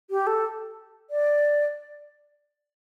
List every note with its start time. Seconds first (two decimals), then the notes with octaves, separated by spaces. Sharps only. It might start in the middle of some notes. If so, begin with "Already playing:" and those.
0.10 G4
0.27 A4
1.10 D5